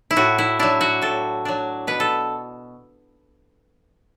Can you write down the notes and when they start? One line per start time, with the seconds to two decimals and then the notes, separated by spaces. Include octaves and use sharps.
0.11 E4
0.16 A2 F#4
0.38 E4
0.59 F#3 D4 E4
0.81 F#4
1.01 A2 A4
1.45 F#3 D4
1.87 B2 B4
2.00 A4